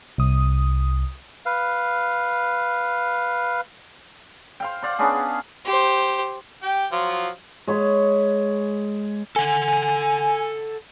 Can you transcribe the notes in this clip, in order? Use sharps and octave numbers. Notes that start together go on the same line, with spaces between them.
C2 D#6
B4 F5
C5 F5 G5
C5 D5 F5 F#5
B3 C#4 D4 G#4
G4 C5
G4 G5
F3 F#3 F4
G#3 C#5 B5
A4 F#5 G#5